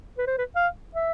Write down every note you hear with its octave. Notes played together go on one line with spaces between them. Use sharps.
B4
C5
B4
F5
E5